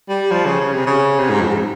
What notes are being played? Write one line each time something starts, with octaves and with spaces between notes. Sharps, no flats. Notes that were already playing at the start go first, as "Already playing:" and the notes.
G3
F3
C#3
C#3
C3
C#3
C3
G#2
F2
G#2